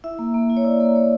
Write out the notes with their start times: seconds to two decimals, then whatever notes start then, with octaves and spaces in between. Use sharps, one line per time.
0.04 E4 E5
0.19 A#3
0.34 A#3
0.50 E4
0.57 C#5
0.64 E4 D5
0.80 A#3
0.95 A#3 C#5